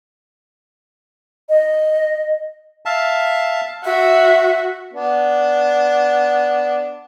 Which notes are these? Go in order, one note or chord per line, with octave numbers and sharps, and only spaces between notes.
D#5
E5 F5 A5
F#4 E5
B3 D4